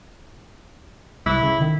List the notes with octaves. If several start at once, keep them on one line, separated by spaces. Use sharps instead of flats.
C2 E4
C#3
D#3